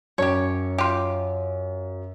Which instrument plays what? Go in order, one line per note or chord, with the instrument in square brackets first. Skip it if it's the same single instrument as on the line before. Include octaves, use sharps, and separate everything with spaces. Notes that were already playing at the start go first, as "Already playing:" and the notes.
[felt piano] F#2 [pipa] G4 C#5
[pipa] F4 G4